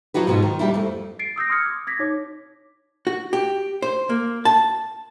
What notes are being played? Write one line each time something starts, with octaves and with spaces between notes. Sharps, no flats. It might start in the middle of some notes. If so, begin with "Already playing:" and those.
F3 F#3 F4 F#4 B4
G#2 B2 G#3 F4 F#4
D#3
F2 A#2 G3 A#3 D4 E4
F2 A3
A6 C7 D7
D#6 E6 G6 A#6
C6 D#6 F6 G#6 C#7
D6
D6 G#6 A#6 B6
D#4 C#5 D6
F#4
G4
C5
A#3
A5